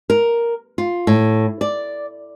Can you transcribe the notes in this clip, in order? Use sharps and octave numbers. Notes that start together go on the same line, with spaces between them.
A#4
F4
A2
D5